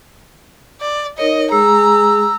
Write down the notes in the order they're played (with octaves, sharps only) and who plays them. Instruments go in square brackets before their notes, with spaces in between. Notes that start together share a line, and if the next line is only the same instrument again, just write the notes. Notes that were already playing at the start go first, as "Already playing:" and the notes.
[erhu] D5
[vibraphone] D#4 A#4 C#5 [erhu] D#5
[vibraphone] G#3 [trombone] G#4 [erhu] A#5 [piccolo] E6